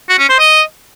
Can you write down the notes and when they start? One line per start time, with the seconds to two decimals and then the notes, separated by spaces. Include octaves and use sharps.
0.09 F#4
0.19 C#4
0.29 C5
0.39 D#5